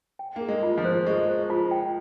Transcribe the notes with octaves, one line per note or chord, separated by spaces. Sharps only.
G5
A#3 G#4
G#3
F4
F3
C5
G#3 C#6
C5
F4
G5